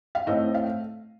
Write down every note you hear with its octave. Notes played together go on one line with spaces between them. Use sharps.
F5
A2 A3 C4 D#5
F5